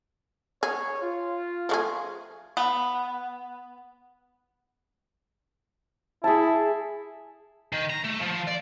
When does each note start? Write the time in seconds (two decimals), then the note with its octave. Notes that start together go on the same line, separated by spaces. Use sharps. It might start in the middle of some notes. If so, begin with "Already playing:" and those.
0.63 G#4 C#5
1.02 F4
1.69 F3 A3 G#4
2.57 B3
6.24 E4 G#4 A5
7.72 D#3
7.90 A#5
8.04 A3
8.21 F3
8.47 D5